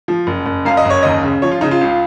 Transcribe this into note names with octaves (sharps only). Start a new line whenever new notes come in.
F3
F#1
F#1
F#2 F5
D#5
F#1 C#5
D#2 D#5
C#3
F3 C#5
F4
C#3 D#4
F4
C#2